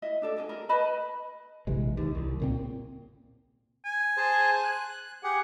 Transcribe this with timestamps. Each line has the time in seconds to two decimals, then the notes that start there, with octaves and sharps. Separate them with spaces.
0.02 E4 D#5 E5
0.22 D4 A4 D5
0.37 D4 E4 G#4 D#5
0.49 A#4
0.69 B4 D#5 A5 B5
1.67 A#1 C3 E3 G#3
1.97 D#2
2.15 C2
2.40 C#2 A#2 C4
3.85 G#5
4.17 G#4 C5 A5
4.64 F#6
5.23 G4 G#4 F#5